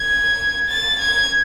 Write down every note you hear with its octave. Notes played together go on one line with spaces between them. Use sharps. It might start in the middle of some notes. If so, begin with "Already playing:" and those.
Already playing: G#6
A6
G#6